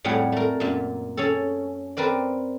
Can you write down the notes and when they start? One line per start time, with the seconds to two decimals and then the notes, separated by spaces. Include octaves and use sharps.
0.04 F2 A2 G3 G#4 F#5
0.32 A3 A#4
0.60 F#2 A#2
1.17 C#4 G#4 A4
1.97 C4 A#4 B4 D5